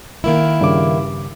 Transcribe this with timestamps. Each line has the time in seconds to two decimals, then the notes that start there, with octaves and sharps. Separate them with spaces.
0.24 D#3 A#3 E4
0.61 G2 C#3 D6